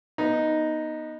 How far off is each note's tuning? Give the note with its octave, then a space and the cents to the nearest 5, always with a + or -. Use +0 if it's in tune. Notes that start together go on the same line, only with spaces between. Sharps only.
B3 -20 D#4 +0